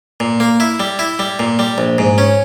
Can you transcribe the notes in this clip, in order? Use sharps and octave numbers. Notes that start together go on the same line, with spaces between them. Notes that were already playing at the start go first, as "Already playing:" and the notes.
A#2
A#3
E4
G3
E4
G3
A#2
G3
A#1
G#2
C#4